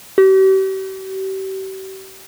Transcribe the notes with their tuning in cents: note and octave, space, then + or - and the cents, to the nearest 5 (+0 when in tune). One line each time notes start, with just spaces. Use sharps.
G4 -40